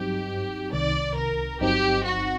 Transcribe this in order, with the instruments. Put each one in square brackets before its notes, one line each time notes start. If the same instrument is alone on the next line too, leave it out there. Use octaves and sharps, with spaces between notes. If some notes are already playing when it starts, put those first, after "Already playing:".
Already playing: [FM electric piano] G2 F#3 C4 D#4 [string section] G4
[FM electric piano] C2 C3 D#3 [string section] D5
[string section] A#4
[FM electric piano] G1 G2 F#3 C4 D#4 [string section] G4
[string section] F#4